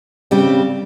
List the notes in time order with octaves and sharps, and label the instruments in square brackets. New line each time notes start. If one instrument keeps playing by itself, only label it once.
[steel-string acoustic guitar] C#3 G3 C4 G4